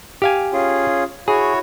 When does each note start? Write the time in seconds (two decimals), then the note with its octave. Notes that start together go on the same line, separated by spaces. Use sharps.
0.22 G4 F5 G#5
0.53 C#4 F4 G#4
1.28 E4 F#4 G#4 C#5